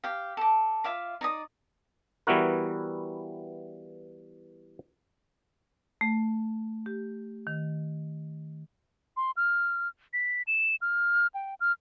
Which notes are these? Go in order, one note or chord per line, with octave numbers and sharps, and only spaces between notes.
G4 F5
A4 D6
F4 E5 F5 D6
D#4 D5 D#6
E3 G3 B3 E4 F#4 A#4
A3
G4
D#3
C6
F6
B6
E7
F6
G5
F6